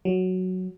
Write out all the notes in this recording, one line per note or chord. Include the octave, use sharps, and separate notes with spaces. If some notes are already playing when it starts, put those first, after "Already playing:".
F#3